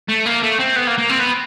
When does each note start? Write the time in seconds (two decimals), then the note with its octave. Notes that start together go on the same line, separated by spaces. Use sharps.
0.08 A3
0.25 A#3
0.43 A3
0.59 C4
0.76 B3
0.87 A#3
0.98 A#3
1.10 C4
1.20 B3